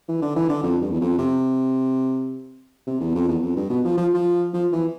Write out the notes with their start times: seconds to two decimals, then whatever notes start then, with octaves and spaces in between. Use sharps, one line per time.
0.08 E3
0.22 D3
0.36 E3
0.49 D3
0.63 F2
0.81 G2
0.91 E2
1.01 F2
1.18 C3
2.87 C3
3.00 E2
3.15 F2
3.28 E2
3.42 F2
3.56 G2
3.70 B2
3.84 F3
3.97 F3
4.14 F3
4.54 F3
4.72 E3